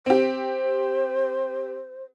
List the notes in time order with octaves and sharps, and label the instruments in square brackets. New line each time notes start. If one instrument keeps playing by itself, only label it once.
[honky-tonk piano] C4 G4 [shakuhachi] C5